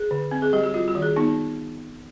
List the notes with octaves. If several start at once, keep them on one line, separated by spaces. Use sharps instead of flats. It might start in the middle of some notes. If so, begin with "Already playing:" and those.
Already playing: G#4
D3
C4
G#4
G3 G4
F#4
G3 F4
F#4
D#3
G#4
B3 D#4